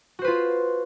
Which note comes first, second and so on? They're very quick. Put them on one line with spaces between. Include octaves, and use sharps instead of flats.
F#4 C5 B4 F4